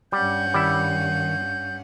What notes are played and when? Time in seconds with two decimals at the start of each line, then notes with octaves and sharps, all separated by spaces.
0.12 G2 G3 C#4 F#5 G6
0.54 D#3 G3 E4